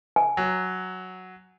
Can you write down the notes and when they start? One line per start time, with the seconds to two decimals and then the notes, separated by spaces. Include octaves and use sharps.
0.16 G#5
0.37 F#3